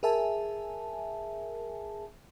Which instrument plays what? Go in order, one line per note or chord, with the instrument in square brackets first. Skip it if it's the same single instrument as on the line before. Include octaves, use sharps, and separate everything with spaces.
[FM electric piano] G#4 A#4 E5 G#5 A5